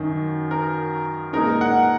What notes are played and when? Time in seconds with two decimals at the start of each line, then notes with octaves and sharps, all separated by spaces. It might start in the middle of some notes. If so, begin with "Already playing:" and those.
Already playing: F#2 D#3 F#3 D#4
0.51 A#4
1.33 A#2 G#3 D#4 A#4
1.61 F#5